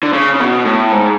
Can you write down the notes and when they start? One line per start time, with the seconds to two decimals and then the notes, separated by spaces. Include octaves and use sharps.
0.03 D3
0.13 C#3
0.35 C#3
0.40 B2
0.65 A2
0.92 G#2